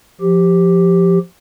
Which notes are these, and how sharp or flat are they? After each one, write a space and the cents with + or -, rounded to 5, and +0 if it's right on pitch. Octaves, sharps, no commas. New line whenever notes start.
F3 +0 G4 +0